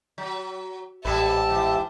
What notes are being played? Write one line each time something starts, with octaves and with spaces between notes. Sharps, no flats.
F#3
A1 G#2 G3 G4 A4 B4 E5 A5
E3